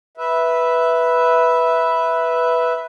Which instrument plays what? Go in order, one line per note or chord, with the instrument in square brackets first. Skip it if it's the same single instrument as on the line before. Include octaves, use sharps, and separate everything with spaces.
[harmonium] B4 E5